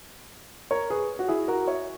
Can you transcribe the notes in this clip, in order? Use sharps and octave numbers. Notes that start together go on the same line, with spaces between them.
A#4 C#5
G#4 B4
F#4
E4 G#4
F#4 A#4
C#5 E5